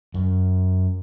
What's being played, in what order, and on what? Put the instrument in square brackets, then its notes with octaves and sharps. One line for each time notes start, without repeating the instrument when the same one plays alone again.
[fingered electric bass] F#2